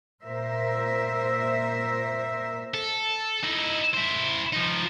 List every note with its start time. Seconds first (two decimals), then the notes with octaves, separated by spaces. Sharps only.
0.24 A#2 A#4 C5 E5
2.74 A4
3.43 D#4 E4
3.93 E4 C5
4.53 F3 D#4